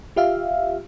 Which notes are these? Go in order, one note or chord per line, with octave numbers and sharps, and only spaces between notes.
F4 G4 E5 F5